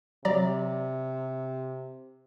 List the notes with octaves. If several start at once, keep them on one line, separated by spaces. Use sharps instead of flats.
C3 F#3 D5 A#5